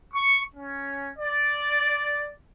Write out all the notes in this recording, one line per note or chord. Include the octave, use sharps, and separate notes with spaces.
C#6
C#4
D5